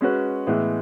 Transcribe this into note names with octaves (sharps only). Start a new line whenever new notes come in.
G#3 C#4 F#4 B4
A2 E3 G#3 B3